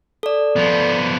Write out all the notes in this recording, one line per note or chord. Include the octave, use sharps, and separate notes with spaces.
A4 D5
F3 B3